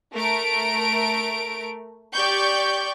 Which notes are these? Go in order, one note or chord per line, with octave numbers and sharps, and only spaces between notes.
A3 A#4 D7
G4 D5 C#6 G6